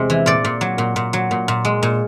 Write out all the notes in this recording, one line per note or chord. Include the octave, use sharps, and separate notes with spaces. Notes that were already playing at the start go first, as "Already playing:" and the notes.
Already playing: E2 C3 G#3
E3
A#2 D5
A#2
F#3
A#2
A#2
F#3
A#2
A#2
G#3
A#2